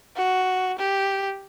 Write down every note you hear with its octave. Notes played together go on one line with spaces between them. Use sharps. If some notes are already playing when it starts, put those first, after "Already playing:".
F#4
G4